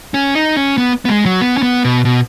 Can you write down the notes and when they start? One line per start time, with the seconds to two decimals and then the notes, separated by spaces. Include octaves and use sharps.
0.14 C#4
0.35 D#4
0.56 C#4
0.78 B3
1.05 B3
1.09 G#3
1.26 F#3
1.41 B3
1.57 C#4
1.63 B3
1.84 B2
2.05 B2